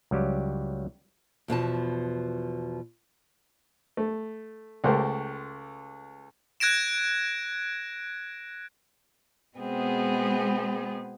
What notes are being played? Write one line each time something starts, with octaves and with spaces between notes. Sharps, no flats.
C#2 F#3 G3 G4
E2 B2 F3 A5
A3
C#2 A3 G4 A#4 C5
F#6 G#6 A#6 D7 E7
B2 G#3 B3 C4 G#4